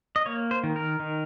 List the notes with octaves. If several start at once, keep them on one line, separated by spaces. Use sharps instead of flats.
D#5
A#3 C#5
C5
D#3
A#4
D#3